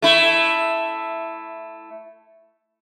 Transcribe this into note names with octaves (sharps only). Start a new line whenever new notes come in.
A3 E4